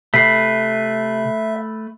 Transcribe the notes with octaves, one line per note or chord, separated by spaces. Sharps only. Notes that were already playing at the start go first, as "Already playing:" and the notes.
C3 A3 B4 E5 B6 C7